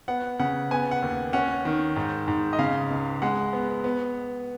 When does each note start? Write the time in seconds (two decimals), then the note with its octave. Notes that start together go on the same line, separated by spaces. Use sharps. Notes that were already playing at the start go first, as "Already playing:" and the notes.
0.08 B3 F#5
0.39 C#3 F#5
0.71 B3 G#5
0.91 F#5
1.02 D#2
1.33 C#4 F#5
1.65 D#3
1.96 G#2
2.28 G#2
2.53 D#5
2.59 C#3 F5
2.90 C#2
3.22 G#3 F#5
3.53 B3
3.84 B3